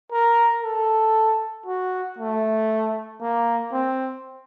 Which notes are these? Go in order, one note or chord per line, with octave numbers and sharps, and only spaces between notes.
A#4
A4
F#4
A3
A#3
C4